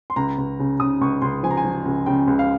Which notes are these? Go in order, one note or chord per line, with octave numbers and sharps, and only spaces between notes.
C6
C#2 A#5
C#2
C#3
C#3 D#6
C#2 C#6
C#2 C6
F3 G#5
A#5
G#5
F3
C#2
C#3 G5
C#2
F5